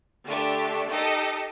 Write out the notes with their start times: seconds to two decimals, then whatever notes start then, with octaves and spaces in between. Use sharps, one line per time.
0.25 D3 A3 D4 G4
0.88 D#4 G4 A4 D#5